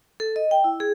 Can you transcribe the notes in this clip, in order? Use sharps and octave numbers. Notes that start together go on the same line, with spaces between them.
A4
D#5
G5
E4
G#4